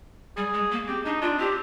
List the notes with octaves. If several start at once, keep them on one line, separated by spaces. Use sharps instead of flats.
G3 G#4
G#3
A#3
C4 G4
D4 D#4
D4 F4
C4 G4